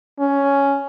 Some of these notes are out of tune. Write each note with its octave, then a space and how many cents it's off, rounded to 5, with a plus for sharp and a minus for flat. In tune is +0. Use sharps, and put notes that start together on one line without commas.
C#4 +5